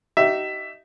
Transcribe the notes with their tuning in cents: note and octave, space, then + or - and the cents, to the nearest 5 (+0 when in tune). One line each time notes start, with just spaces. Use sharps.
D#4 +0 G4 -45 E5 +10